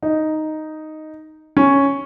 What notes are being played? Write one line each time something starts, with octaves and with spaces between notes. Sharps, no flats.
D#4
C#4